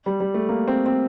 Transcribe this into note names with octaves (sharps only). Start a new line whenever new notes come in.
G3
G3
A3
A#3
C4
C4